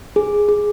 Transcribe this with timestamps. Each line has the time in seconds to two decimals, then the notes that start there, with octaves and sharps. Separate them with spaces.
0.16 G#4
0.49 G#4